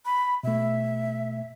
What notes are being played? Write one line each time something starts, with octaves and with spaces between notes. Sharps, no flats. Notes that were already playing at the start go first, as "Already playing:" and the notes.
B5
B2 A3 E5